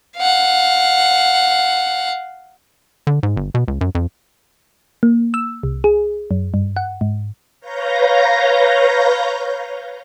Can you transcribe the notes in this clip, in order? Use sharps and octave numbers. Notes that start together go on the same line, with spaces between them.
F5 F#5
D3
G#2
G1
B2
C#2
F#2
F2
A#3
E6
C2
G#4
F#2
G2
F#5
G#2
B4 C#5 F5 A#5 G6 A#6